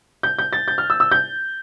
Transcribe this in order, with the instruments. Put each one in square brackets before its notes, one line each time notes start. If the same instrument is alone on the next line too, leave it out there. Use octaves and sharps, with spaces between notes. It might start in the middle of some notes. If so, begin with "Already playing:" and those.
[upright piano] G6
G6
A6
G6
F6
E6
E6
G6